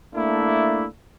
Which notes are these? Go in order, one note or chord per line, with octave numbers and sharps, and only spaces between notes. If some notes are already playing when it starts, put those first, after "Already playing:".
A3 A#3 D4 E4